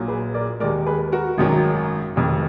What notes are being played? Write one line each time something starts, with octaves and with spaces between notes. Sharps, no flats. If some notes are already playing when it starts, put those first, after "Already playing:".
Already playing: A#1 A#2 F#3
G#4 B4
A#4 D5
D#2 D#3 G#3 A#4 D5
G#4 B4
F#4 A#4
G#1 F#2 D#3 F#3
F1 F2 D#3